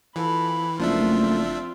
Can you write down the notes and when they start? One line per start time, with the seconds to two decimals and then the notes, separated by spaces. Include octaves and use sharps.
0.16 E3 C4 F4 A4 B5
0.79 F#1 F3 A3 A#3 C4 D4 F4 E5